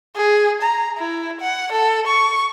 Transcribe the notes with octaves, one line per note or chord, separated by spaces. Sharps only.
G#4
A#5
E4
F#5
A4
C#6